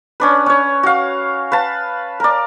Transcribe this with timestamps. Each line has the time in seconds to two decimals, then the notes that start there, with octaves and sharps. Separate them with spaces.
0.20 C#4 D4 B4
0.46 C#4 C#5
0.83 F#4 F5
1.52 B4 F5 A5
2.20 A#4 D5